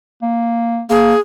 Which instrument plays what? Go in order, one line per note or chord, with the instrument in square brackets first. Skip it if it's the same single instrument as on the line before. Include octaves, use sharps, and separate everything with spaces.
[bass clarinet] A#3
[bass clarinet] A#3 [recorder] G#4